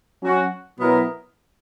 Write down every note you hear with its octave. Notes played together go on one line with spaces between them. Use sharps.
F#3 C#4 F#4
B2 F#3 B3 E4 A#4